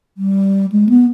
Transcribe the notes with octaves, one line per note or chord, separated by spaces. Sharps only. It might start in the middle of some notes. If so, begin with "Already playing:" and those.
G3
G#3
B3